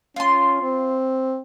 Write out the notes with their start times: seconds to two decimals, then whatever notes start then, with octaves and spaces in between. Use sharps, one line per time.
0.16 C#4 F4 C6
0.62 C4